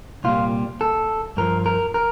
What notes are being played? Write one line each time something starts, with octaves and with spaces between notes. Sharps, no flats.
C2 A#2 G3 F4
A4
G2 F3 A#4
A#4
A#4